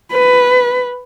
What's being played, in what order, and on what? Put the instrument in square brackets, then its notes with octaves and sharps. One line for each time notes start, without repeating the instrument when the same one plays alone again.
[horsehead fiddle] B4